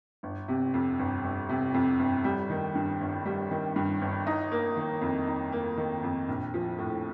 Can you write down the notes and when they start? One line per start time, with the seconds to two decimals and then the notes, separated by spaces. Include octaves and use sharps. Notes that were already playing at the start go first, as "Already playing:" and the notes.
0.23 G1
0.48 C3
0.74 F2
0.99 G1
1.24 G1
1.49 C3
1.74 F2
1.99 G1
2.24 G3
2.50 D#3
2.75 G2
3.01 G1
3.25 G3
3.51 D#3
3.76 G2
4.01 G1
4.27 D#4
4.52 A#3
4.77 D#3
5.01 F2
5.27 D#4
5.52 A#3
5.77 D#3
6.03 F2
6.29 A#1
6.54 F3
6.78 A2